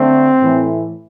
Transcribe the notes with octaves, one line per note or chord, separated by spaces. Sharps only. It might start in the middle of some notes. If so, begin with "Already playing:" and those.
Already playing: D3 A3 C4
A2 E3 A3